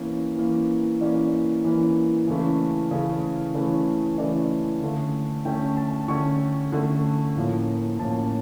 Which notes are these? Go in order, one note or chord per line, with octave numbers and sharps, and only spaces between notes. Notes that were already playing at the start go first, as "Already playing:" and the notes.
Already playing: E3 A#3 C#4 C#5
E3 A#3 C#4
E3 A#3 C#4 D5
E3 A#3 C#4
C#3 E3 A3 C#4
C#3 E3 A3 C#4
C#3 E3 A3 C#4
C#3 E3 A3 C#4 D5
D3 A3 C#4 F5
D3 A3 C#4 G5
A5
D3 A3 C#4 C#6
D3 A3 C#4
A2 F3 A#3 C#4
A2 F3 A#3 C#4 A5